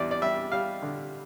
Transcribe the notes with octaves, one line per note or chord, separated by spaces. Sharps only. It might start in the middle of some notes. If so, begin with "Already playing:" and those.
Already playing: E2 G3 D5
D5
G3 E5
G3 F5
D3